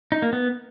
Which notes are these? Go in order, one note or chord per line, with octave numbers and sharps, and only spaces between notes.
D#4
A#3
B3